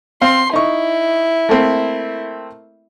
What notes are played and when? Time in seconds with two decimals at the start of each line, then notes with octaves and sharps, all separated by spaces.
0.22 C4 F5 C6
0.54 D#4 E4 C#6
1.49 A3 A#3 C4